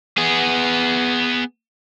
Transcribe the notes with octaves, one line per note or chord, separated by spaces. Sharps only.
B3 G#4